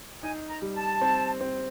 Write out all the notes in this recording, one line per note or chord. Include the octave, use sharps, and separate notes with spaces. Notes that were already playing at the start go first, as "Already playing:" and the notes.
D#4 G#5
A#5
G3
A5
C4
C4